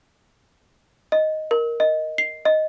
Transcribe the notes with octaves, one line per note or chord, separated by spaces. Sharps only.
D#5
A#4
D#5
C7
D#5